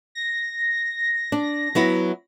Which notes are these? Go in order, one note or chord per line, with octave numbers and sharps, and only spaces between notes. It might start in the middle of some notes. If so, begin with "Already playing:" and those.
A#6
D4
F#3 B3 E4